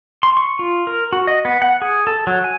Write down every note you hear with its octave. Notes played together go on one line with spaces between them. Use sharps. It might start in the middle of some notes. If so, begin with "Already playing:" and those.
C6
C#6
F4
A#4
F#4
D#5
B3
F#5
G#4
A4
F#3
G#5